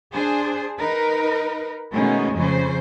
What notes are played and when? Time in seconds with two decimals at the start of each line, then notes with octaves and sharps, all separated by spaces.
0.12 D4 G#4 C5
0.77 D#4 A#4 B4
1.92 B2 D#3 G#3 A3 C#4 D#4
2.33 F2 C#3 C#4 C5